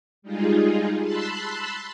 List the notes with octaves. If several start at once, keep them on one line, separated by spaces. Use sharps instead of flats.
G3 G#3 D#4 F4 G#4
A5 B5 C6 E6 F#6